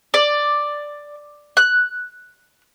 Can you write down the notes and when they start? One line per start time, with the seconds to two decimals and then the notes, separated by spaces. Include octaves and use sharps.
0.14 D5
1.57 F#6